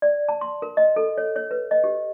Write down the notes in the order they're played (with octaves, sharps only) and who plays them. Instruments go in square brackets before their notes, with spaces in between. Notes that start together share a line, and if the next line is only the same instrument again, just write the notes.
[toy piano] D5
A5
C6
A#4
D#5
A4
C#5
C#5
B4
D#5
G4